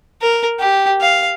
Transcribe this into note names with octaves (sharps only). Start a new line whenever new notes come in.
A#4
G4
F5